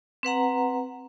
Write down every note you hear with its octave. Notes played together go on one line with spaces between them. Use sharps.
C4 B4 F#5 A#5